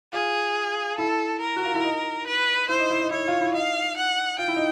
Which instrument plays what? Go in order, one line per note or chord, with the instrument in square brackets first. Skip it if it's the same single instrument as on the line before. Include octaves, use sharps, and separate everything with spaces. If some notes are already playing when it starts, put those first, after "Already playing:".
[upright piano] F4 [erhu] G#4
[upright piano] E4 [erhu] A4
[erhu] A#4
[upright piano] F#4
F4
E4
D#4
[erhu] B4
[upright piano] E4 [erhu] C5
[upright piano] D#4
E4
D#4
[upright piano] E4 [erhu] C#5
[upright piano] F4
E4
[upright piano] D#4 [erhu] F5
[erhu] F#5
[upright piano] F4 [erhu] G5
[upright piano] E4
D#4